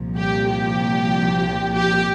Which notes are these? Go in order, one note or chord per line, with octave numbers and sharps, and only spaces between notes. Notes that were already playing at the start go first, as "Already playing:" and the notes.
Already playing: C2 A#2 F3
G4
G4
G4